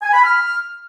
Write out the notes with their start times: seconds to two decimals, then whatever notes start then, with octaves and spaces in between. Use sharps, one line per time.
0.02 G#5
0.13 B5
0.24 F6